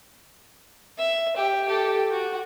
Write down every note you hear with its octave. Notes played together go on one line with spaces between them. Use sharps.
E5
G4
G4 A4
F#4